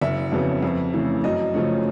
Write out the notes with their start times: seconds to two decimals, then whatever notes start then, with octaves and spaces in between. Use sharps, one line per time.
0.01 F#1 E5
0.32 F2 C#3 F#3 B3
0.63 F2
0.94 C#3 E3 A3
1.24 F#2 D#5
1.54 C#3 F3 A3 C#4